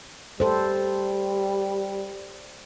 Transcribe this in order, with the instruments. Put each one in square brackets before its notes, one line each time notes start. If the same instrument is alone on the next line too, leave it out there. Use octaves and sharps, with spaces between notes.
[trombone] G3 [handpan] A4 C5